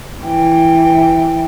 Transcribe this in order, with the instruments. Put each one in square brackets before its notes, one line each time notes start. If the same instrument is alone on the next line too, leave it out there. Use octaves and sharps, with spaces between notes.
[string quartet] E3 G5